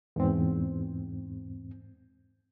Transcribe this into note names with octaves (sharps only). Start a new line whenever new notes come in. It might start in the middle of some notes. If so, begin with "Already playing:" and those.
E2 G#2 C4